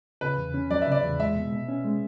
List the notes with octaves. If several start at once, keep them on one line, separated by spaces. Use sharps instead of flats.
C#3 B4
E2
C#4
F#3 D5
E5
C#3 D5
E2
G#3 E5
B2
B2
C#4
G#3